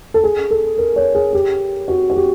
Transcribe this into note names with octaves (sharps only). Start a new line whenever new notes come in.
A4
G#4
A4
A#4
C#5
G#4
G4
F#4
F#4
G4